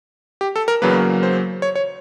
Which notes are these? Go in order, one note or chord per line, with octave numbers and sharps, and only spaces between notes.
G4
A4
A#4
E2 C#3 F#3 A#3 B4
C5
C#5
C#5